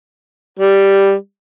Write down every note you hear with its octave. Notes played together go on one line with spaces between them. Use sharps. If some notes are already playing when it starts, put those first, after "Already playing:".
G3